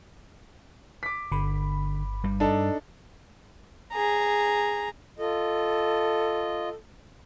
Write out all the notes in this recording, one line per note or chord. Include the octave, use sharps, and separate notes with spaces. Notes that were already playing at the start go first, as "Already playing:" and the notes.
D6 B6
G1 D3 B5
G2 G3
D4 D#4 A4
G#4 A#5
F4 A4 D#5